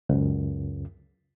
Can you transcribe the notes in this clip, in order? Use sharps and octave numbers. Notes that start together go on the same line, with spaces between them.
C#2 F#2